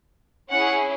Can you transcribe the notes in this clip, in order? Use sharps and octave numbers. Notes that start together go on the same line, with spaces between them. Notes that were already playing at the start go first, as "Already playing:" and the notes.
C#4 E4 G#4 F#5